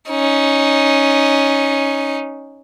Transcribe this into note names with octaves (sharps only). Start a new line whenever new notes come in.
C#4 D#4